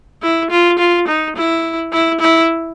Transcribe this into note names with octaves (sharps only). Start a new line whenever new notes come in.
E4
F4
F4
D#4
E4
E4
E4